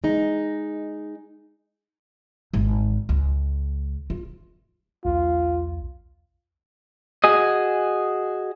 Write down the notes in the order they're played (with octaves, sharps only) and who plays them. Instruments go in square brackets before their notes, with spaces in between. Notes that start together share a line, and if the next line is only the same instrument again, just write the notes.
[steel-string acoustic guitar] G#3 D#4
[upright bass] G#1
C#2
F4
[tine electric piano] B1 E2 [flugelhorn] F4
[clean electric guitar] F#4 G#4 D#5